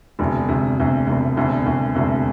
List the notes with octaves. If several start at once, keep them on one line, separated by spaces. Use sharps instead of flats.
E1 D2 C3
E1 D2 C3
E1 D2 C3
E1 D2 C3
E1 D2 C3
E1 D2 C3
E1 D2 C3